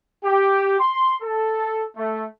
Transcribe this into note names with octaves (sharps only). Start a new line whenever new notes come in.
G4
C6
A4
A3